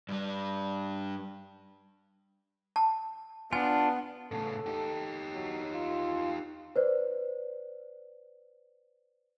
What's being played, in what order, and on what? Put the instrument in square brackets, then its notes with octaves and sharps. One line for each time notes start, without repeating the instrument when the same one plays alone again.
[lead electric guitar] G2 G3
[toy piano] A5
[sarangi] B3 [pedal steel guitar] D4 F4 [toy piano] G#5
[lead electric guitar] A2 C#3 [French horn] A4
[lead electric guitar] D#4 G4
[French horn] F#3
F4
[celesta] B4 C5 D5